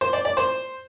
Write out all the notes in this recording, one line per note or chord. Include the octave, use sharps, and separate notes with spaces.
C5
D5
D5
C5